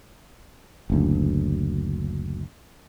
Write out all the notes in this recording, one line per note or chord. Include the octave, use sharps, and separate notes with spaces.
F#1 D2